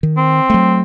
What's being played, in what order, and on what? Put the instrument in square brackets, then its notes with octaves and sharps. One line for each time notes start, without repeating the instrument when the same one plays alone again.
[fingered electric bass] D#3
[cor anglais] C4
[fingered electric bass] F#3 A3